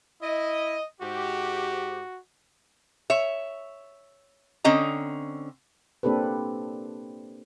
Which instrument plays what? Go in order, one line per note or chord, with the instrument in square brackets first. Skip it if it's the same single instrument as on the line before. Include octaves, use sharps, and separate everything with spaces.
[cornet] E4 [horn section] D#5
[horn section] G#2 G4 [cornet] F#4
[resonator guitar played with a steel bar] C#5 E5
D3 C4 C#4 D#5 A#5
[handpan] A#3 C4 D4 G4 A4 B4